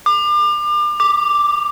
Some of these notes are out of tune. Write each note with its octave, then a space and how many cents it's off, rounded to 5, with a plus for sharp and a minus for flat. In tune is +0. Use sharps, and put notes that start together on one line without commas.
D6 +35
D6 +0